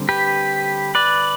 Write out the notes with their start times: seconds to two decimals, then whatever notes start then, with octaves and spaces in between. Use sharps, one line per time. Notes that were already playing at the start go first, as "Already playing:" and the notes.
Already playing: D3 G3 C4
0.09 G4 B4
0.95 B4 D5